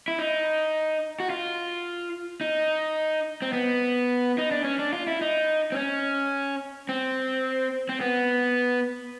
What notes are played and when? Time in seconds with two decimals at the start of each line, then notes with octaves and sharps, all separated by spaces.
0.08 E4
0.19 D#4
1.20 F#4
1.30 F4
2.41 D#4
3.42 C4
3.53 B3
4.38 D#4
4.51 D4
4.64 C#4
4.79 D4
4.93 F4
5.07 E4
5.21 D#4
5.72 C4
5.76 C#4
6.89 C4
7.89 C4
8.01 B3